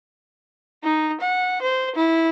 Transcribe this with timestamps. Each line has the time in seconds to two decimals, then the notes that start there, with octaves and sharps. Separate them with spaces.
0.83 D#4
1.20 F#5
1.62 C5
1.96 E4